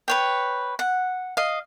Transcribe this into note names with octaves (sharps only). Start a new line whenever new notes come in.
B4 C#5 G5
F#5
D#5 F5